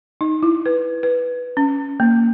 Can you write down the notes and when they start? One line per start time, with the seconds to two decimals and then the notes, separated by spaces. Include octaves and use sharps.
0.21 D#4
0.43 E4
0.66 B4
1.03 B4
1.57 C#4
2.00 A#3